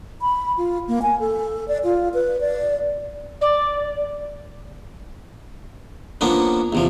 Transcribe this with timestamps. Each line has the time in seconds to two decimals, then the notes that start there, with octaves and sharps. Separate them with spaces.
0.21 B5
0.57 F4
0.88 A#3
1.02 G#5
1.20 A4
1.68 D5
1.84 F4
2.14 B4
2.41 D5
3.41 D5
6.21 F3 A#3 B3 C#4 D4
6.73 E2 C3 F3